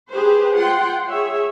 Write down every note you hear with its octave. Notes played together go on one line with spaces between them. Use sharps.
G4 G#4 B4 C5
F4 F#5 G5 C6
G#4 C#5 E5